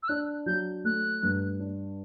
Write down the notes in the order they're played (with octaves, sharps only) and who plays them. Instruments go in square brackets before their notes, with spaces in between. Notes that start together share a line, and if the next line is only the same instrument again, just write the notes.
[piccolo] E6
[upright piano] D4 [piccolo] F#6
[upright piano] F#3 [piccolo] G6
[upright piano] A3 [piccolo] F#6
[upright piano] G2
D4